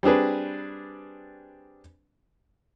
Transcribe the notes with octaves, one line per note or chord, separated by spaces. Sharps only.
G3 C4 D4 G#4 B4